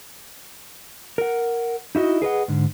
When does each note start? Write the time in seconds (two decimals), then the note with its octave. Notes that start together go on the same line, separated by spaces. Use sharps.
1.18 A#4 F#5
1.95 D#4 E4 F#4 D#5
2.22 G#4 B4 D#5 F#5
2.48 G#2 D3